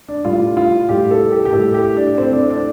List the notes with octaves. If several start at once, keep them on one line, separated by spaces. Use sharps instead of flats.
D4
A2 G3 F4
F4
A2 G3 G4
A4
G4
G4
A2 G3 A4
G4
D4
A2 A3 C4
D4
D4